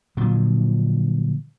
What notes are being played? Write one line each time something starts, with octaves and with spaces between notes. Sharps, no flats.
A#2 D3 F3 F#3